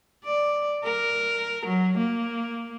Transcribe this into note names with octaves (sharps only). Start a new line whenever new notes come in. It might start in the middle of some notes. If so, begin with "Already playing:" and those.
D5
A#4
F#3
A#3